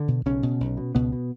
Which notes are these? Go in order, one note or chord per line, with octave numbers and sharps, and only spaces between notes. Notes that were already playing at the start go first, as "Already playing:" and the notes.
Already playing: D3 D4
B2
B1 C#3 C#4
B2
B1
B2
C#2 B2 B3
B2